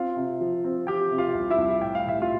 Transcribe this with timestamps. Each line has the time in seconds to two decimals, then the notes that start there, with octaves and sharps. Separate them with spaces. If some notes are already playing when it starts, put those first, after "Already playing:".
Already playing: C4 F4 F5
0.16 C3
0.41 F3
0.64 C4
0.87 F3 G4 G5
1.11 C3
1.18 F4 F5
1.35 C2
1.50 E4 E5
1.58 C2
1.81 A2 G5
1.95 F5
2.06 A2 E5
2.22 F4 F5